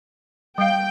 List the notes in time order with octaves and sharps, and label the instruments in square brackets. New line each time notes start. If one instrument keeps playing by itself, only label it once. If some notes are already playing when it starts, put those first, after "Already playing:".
[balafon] G3 F5 [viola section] G5